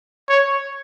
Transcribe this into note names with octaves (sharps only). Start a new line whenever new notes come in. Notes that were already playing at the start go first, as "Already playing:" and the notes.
C#5